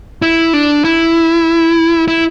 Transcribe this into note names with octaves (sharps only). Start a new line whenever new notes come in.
E4
D4
E4
E4